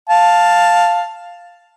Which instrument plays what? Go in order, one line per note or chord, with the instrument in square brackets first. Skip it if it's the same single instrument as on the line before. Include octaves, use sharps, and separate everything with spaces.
[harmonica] F5 A5